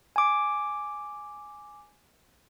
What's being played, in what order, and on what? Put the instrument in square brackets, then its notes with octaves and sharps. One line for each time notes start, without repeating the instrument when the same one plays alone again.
[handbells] G#5 D6